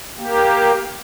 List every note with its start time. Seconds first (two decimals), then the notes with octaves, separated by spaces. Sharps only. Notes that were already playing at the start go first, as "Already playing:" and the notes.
0.19 A#3 G4